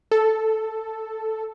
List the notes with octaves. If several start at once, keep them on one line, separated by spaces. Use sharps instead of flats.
A4